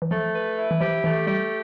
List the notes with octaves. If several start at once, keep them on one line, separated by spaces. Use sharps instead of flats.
E3
F3 A3
B4
E4
E3
F3 G4
E3 A3
G3 G4